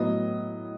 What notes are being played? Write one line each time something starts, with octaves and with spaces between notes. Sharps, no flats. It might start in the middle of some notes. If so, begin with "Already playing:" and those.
Already playing: A2 F#3 B3 D#5